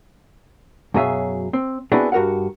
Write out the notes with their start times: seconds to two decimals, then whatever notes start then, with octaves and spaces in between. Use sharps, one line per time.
0.94 F#2 B2 F#3 G#4 E5 F5
1.53 C4
1.92 B3 C4 D4 E4 F#4 G#4
2.12 G2 F#4 A#4 F5 F#5